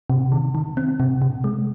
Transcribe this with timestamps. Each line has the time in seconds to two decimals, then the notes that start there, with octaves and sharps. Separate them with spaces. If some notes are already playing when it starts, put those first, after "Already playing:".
0.10 C3
0.32 D#3
0.55 D#3
0.77 C4
1.00 C3
1.22 C3
1.44 G#3